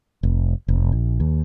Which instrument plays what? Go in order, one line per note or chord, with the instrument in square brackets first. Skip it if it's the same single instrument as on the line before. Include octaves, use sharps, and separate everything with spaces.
[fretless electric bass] F1
F1
A#1
D#2